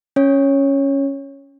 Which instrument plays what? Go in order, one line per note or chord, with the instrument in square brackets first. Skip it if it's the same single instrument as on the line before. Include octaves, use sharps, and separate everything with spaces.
[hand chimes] C#4 C#5